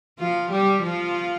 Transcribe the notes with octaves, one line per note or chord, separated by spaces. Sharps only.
F3 F4
G3 G4
F3 F4